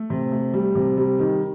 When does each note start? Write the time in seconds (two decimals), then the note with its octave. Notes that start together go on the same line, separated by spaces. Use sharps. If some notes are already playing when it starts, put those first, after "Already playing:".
Already playing: A3
0.10 C3
0.32 A3
0.54 G3
0.75 C3
0.97 G3
1.19 D#3